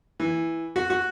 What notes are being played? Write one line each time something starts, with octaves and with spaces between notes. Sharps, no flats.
E3
F#4
F#4